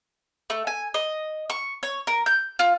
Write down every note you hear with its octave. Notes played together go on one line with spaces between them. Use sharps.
A3
G#5
D#5
C#6
C#5
A#4
G6
F4